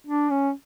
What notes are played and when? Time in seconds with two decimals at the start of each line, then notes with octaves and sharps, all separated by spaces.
0.07 D4
0.30 C#4